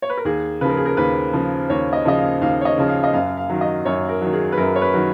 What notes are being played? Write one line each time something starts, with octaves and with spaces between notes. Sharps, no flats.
C#5
B4
A#4
D#2 G#4
C#3 F3 A#4 B4
G#4
A#4
D#2 B4
C#3 F3
D#2 C#5
D#5
C#3 F3 D#5
F5
D#2 F5
C#5
D#5
C#3 F3
F5
D#5
F#2 F5
F5
D#3 F#3
D#5
F#2 C#5
A#4
D#3 F#3
G#4
B4
F#2 A#4
C#5
B4
D#3 F#3